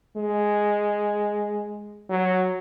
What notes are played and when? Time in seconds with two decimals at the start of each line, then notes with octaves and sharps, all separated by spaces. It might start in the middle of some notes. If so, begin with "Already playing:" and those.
0.17 G#3
2.09 F#3